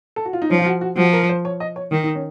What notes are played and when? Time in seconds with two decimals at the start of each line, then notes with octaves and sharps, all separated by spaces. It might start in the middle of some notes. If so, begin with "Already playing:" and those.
0.16 A4
0.25 F#4
0.33 F4
0.42 D#4
0.50 F3 C#4
0.59 F4
0.66 F#4
0.81 F#4
0.97 F3 F#4
1.13 A#4
1.29 C5
1.45 C#5
1.60 D#5
1.76 C#5
1.92 D#3 D#4
2.03 D#4
2.15 C#4